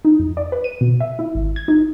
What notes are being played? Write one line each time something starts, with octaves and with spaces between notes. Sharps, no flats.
D#4
F2
D5
B4
D#7
B2
E5
E4
G#1
G#6
D#4